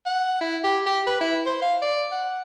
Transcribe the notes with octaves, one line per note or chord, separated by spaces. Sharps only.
F#5
E4
G4
G4
B4
E4
C5
F5
D5
F#5